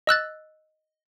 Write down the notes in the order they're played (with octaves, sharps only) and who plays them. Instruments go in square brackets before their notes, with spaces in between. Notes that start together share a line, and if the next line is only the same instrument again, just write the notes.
[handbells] D#5 E6 F#6 A6